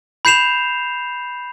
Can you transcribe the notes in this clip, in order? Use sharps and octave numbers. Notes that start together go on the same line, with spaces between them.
B5 G6 C7 E7 F7